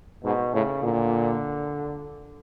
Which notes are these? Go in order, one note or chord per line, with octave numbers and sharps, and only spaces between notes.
G#2 B2
A2 C#3
A#2 D3